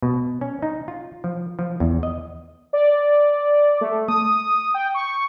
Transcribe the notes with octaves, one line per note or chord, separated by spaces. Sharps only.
B2
C#4
D#4
F4
F3
F3
E2
D#5
D5
A3
D#6
G5
C#6